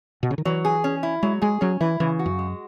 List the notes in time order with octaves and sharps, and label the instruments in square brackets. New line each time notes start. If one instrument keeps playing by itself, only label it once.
[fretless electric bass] B2
C#3
D#3
[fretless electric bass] E3 [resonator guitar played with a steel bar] F#3
[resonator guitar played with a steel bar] G#4
C#4
E4
[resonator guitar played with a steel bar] F#3 [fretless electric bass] G#3
[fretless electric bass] G#3 [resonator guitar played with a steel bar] G#4
[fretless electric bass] F#3 [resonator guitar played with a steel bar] C#4
[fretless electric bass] E3 [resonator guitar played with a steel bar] E4
[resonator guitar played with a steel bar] C#3 [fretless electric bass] E3
[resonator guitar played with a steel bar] F#4
[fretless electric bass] F#2
[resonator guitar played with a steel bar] G#3